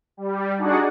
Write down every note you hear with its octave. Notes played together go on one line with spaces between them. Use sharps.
G3
D4 D#4 F#4 G#4 D5 F#5